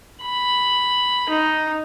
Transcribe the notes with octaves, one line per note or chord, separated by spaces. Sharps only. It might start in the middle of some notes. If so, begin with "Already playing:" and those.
B5
D#4